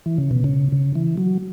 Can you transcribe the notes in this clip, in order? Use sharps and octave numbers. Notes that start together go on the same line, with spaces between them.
E3
C#3
B2
C#3
C#3
E3
F#3